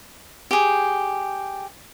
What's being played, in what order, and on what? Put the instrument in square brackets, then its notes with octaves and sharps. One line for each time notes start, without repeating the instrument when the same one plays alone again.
[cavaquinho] G4 G#4